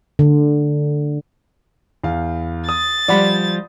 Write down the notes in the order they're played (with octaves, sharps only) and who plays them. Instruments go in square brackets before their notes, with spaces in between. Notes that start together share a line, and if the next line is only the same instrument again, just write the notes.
[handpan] D3
[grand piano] E2 F5
[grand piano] D#6 [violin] A6
[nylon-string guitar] F3 G3 [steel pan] D5 F#5 B5